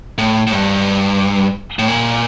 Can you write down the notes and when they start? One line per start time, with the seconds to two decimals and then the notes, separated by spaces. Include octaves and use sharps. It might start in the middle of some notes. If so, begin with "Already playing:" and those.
0.18 A2
0.47 A2
0.52 G2
1.79 A2
1.88 A#2